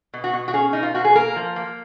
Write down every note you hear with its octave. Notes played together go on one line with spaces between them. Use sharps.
B2
F#4
B2
F#4
C#4 G#4
B2 D#4
F4
B2 F#4
G#4
A#3 A#4
F3
A#3